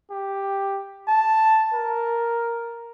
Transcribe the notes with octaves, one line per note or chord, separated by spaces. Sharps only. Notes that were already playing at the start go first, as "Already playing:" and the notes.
G4
A5
A#4